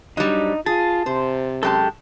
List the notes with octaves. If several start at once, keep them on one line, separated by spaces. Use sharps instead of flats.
F#3 G3 D4 D#4
F4 G#4 A5
C3 C5
F#2 G#3 G4 A4 A5